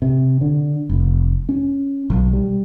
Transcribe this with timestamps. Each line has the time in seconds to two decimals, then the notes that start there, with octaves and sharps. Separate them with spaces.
0.02 C3
0.41 D3
0.89 F1
1.49 C#4
2.10 B1
2.33 G3